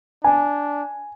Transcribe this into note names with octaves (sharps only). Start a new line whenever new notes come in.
D4 G#5